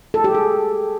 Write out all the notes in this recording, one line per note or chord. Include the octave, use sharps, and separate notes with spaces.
A4
G4
G#4